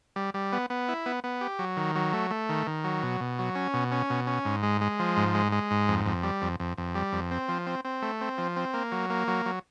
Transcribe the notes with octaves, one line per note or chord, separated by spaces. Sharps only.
G3
G3
B3
B3
E4
B3
B3
G4
F#3
D#3
F#3
A3
A3
D#3
D#3
F#3
B2
B2
F#3
C#4
B2
C#4
B2
C#4
G#2
G#3
G#3
F3
G#2
G#3
G#3
G#2
F2
F2
G3
F2
F2
F2
G3
F2
C4
F3
C4
C4
A3
C4
F3
C4
A#3
F#3
A#3
F#3
F#3